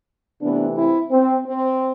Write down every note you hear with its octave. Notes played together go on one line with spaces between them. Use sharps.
C3 E3 A3 B3 D4
C4 E4
C4
C4